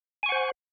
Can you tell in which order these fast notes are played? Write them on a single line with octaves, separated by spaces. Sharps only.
G#5 C#6 F#5 C5